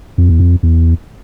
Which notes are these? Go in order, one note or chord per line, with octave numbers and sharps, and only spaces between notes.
F2
E2
F2
E2